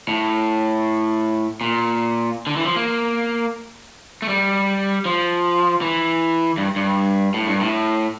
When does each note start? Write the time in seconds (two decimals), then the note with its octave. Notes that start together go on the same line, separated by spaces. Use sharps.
0.08 A2
1.61 A#2
2.47 D3
2.56 E3
2.66 F3
2.76 A#3
4.22 A3
4.29 G3
5.05 F3
5.82 E3
6.57 G2
6.76 G2
7.34 A2
7.47 G2
7.61 A2